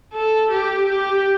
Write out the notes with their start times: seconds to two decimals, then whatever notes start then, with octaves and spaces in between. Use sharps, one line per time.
0.13 A4
0.51 G4
0.89 G4